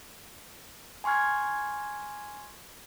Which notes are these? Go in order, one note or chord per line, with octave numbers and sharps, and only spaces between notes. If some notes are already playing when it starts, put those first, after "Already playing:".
G#5 C6 C#6 F6 G#6